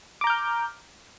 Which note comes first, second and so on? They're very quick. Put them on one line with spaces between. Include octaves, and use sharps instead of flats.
D6 A#5 G6 F6